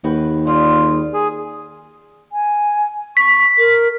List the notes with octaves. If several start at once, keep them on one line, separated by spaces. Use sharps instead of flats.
D#2 F#4 B4 G5
G3 F4 G4 G#4
G#4
G#5
C#6 B6
A#4